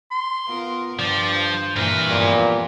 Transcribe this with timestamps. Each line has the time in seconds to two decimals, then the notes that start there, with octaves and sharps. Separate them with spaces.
0.11 C6
0.48 B3 F4 A#4
0.99 G2 F3 D5
1.33 C5
1.76 G2 A#2 E3 A#4 B4
2.11 F2 A#2 B3 G4